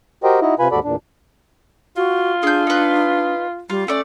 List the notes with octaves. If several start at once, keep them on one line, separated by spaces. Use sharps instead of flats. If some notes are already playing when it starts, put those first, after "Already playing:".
F#4 G4 A#4 C5 D#5 G5
D#4 E4 F#4 D#5
C3 F4 B4 G#5 B5
D#2 G#2 F#4 A4 D5 B5
E2 A#2 D4
F4 F#4
D4 G#4 G6
D#4 B4
G3 F4
A3 C#4 D5